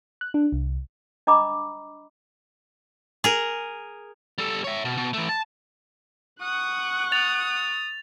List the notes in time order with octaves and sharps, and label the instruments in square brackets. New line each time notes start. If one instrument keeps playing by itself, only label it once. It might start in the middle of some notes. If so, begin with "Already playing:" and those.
[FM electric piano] F#6
D4
C2
[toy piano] D4 D#5 A#5 B5 D6 D#6
[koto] G#4 A#4
[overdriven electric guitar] G3 A4
C#5 E5
B2
B2
E3 A3
A5
[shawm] F#5 [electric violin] C#6 F#6 [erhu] D#6
[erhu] D#6 [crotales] A6 F7